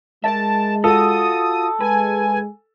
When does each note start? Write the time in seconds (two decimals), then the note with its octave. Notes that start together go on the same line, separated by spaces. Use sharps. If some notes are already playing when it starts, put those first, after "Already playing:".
0.24 G#3 A#4 E5 A5
0.84 F4 F#4 A4 D#6
1.81 G#3 B4 G#5